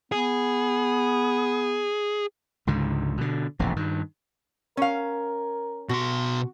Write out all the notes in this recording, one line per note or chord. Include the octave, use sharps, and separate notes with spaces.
B3 G#4
C#2 G#2 D3
B2 D3
E1 A#1 A2 C3
G2 D#3
C#4 A#4 F5
B2 F#4 C6